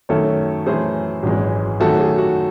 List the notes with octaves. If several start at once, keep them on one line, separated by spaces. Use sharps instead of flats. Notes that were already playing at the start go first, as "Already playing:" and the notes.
F#2 D#3 A3 A4 C#5
F#2 E3 A3 G#4 C5
G#1 F#2 E3 G#3
F#2 D#3 A3 F#4 A4
G#4
F#4